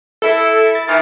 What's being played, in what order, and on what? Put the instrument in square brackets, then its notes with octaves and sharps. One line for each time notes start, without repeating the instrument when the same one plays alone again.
[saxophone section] E4 [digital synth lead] A4
[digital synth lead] A6
[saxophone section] D#3 E3